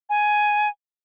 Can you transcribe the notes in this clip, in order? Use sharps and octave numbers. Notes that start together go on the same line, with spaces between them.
G#5